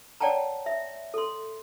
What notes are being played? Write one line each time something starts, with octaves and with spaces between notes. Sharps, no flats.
C#5 D5 F#5 G5 A5 A#5
E5
A4 C6